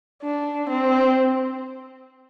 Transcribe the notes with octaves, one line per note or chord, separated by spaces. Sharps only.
D4
C4